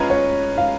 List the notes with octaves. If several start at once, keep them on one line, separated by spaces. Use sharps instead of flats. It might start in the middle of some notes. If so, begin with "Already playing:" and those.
Already playing: G#3 C#4 F4 B4 A#5
C#5
F5